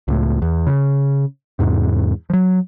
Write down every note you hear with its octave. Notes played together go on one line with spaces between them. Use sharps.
C#2 A2
E2
C#3
E2 G#2 C3
F3 F#3